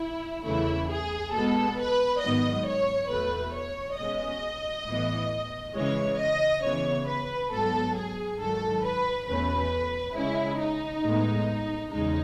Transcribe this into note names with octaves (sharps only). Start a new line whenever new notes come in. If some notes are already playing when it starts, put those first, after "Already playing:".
Already playing: E4
E2 C#3 E3 A3 E4
G#4
B2 G#3 B3 A4
B4
G#2 D#3 F#3 B3 D#5
C#5
E2 B2 A3 B4
C#5
B2 G#3 C#4 D#5
A2 E3 B3
C#3 E3 G#3 C#5
D#5
C#3 E3 B3 C#5
B4
G#2 F#3 B3 A4
G#4
G#2 D#3 F#3 A4
B4
E2 B2 A3 C#4 B4
C#3 G#3 C#4 E4
D#4
A2 G#3 B3
E2 C#3 G#3 D#4